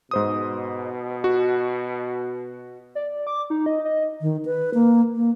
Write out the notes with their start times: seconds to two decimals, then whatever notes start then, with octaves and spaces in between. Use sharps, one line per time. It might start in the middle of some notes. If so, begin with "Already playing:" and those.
0.11 G#2 B2 C5 D#6
1.24 F#4
2.95 D5
3.27 D6
3.50 D#4
3.66 D#5
3.85 D#5
4.21 D#3
4.45 B4
4.74 A#3
5.16 A#3